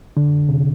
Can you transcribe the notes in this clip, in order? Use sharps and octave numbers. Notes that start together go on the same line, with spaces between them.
D3
C3